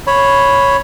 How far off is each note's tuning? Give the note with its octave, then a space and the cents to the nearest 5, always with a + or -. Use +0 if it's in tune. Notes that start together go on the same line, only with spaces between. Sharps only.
C#5 +0 B5 +0